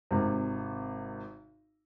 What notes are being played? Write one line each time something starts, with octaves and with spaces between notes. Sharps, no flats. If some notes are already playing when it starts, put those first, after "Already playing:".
G#1 C3